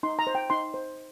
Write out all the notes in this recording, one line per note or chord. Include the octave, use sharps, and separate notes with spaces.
D#4 C6
A#5
C5
G5
D#4 C6
C5